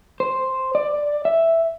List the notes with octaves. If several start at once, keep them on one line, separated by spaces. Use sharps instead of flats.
C5
D5
E5